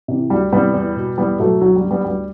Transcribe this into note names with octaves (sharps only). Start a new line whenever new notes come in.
C3 E3
D2 G3
C3 E3 G3 B3
E2
B2
E2 G3 B3
B2 F#3 A3
D2 F#3
G3
D3
G3 B3
D2 G3